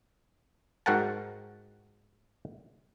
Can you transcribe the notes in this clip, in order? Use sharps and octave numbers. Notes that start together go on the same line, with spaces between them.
G#2 F#4 A#4 F#5 G5 A5